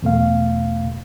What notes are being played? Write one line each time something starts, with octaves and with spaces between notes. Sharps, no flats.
E2 B2 A3 F5